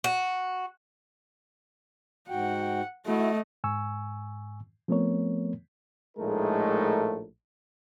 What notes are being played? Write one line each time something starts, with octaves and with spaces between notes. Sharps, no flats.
F#4
G#2 F#4 F#5 G5
A3 E4 F#4 D#5
G#2 G#5 C#6 E6
F3 A3 B3 C4 A#4 C#5
A#1 A2 G#3 A3 D#4 A#4